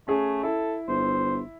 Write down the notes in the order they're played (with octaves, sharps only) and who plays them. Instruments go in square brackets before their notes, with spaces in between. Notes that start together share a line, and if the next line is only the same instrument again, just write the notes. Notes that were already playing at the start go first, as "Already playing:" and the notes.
[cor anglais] A3 [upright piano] C#4 G#4
[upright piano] E4 [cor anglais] A4
[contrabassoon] G1 [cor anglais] C5